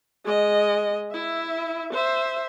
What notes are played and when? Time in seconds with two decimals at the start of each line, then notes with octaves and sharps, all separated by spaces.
0.24 G#3 D#5
1.12 E4 E5
1.93 C5 E5